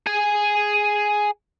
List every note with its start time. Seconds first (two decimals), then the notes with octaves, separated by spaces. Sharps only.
0.07 G#4 G#5